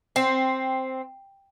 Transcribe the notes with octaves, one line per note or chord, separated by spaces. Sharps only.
C4